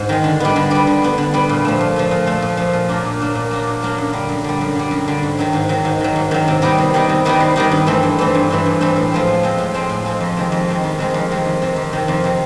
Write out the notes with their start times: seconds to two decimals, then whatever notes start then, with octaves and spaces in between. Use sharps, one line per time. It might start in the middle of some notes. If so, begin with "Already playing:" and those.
Already playing: G#2
0.09 D#3 G#3
0.24 D3
0.40 G3 B3
0.56 D3
0.71 G3 B3
0.87 D3
1.02 G3 B3
1.18 D3
1.34 G3 B3
1.49 A#2
1.65 F3 A3
1.81 A#2
1.96 F3 A3
2.11 A#2
2.26 F3 A3
2.42 A#2
2.57 F3 A3
2.73 A#2
2.89 F#3 A#3 D4
3.05 A#2
3.20 F#3 A#3 D4
3.35 A#2
3.51 F#3 A#3 D4
3.67 A#2
3.83 F#3 A#3 D4
3.98 F#2
4.13 D3 G3
4.29 F#2
4.44 D3 G3
4.61 F#2
4.75 D3 G3
4.91 F#2
5.08 D3 G3
5.23 G#2
5.39 D#3 F#3
5.53 G#2
5.69 D#3 F#3
5.85 G#2
6.00 D#3 F#3
6.16 G#2
6.31 D#3 F#3
6.48 C3
6.62 D#3 G3 B3 D#4
6.78 C3
6.94 D#3 G3 B3 D#4
7.09 C3
7.25 D#3 G3 B3 D#4
7.40 C3
7.56 D#3 G3 B3 D#4
7.71 G2
7.87 E3 A3 C4
8.03 G2
8.19 E3 A3 C4
8.35 G2
8.50 E3 A3 C4
8.66 G2
8.81 E3 A3 C4
8.96 A2
9.12 F3 G#3 C4
9.27 A2
9.43 F3 G#3 C4
9.58 A2
9.74 F3 G#3 C4
9.89 A2
10.05 F3 G#3 C4
10.20 F2
10.37 C3 D#3 G#3
10.52 F2
10.68 C3 D#3 G#3
10.84 F2
10.98 C3 D#3 G#3
11.14 F2
11.31 C3 D#3 G#3
11.45 F2
11.62 C3 D#3
11.76 F2
11.93 C3 D#3
12.08 F2
12.24 C3 D#3